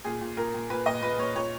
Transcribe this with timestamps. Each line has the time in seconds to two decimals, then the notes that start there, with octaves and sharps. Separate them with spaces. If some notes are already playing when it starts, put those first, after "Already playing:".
0.04 A#2 G#4
0.21 A#2
0.37 A#2 A#4
0.54 A#2
0.70 A#2 B4
0.86 A#2 D#5
1.02 A#2 B4
1.18 A#2 C#5
1.35 A#2 C#5